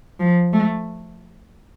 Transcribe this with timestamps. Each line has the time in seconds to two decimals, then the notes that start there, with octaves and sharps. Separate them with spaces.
0.20 F3
0.53 A3